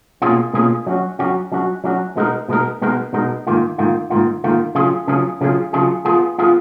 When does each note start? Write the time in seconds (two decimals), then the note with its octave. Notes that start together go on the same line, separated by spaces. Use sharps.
0.22 B2 A#3 C#4 F4 G#4
0.53 B2 A#3 C#4 F4 G#4
0.87 F#3 C#4 F#4
1.19 F#3 C#4 F#4
1.52 F#3 C#4 F#4
1.84 F#3 C#4 F#4
2.16 B2 G#3 B3 D#4 A#4
2.49 B2 G#3 B3 D#4 A#4
2.82 B2 G#3 B3 D#4 A#4
3.13 B2 G#3 B3 D#4 A#4
3.47 G#2 D#3 A#3 F4
3.78 G#2 D#3 A#3 F4
4.10 G#2 D#3 A#3 F4
4.44 G#2 D#3 A#3 F4
4.75 C#3 F#3 C#4 F4 G#4
5.08 C#3 F#3 C#4 F4 G#4
5.41 C#3 F#3 C#4 F4 G#4
5.73 C#3 F#3 C#4 F4 G#4
6.05 F3 B3 F4 G#4
6.38 F3 B3 F4 G#4